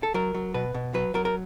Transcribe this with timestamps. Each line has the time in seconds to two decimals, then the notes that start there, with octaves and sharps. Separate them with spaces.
0.03 A4
0.14 F#3 A#4
0.35 F#3
0.54 B2 B4
0.74 B2
0.94 F#3 B4
1.14 F#3 A#4
1.25 A#4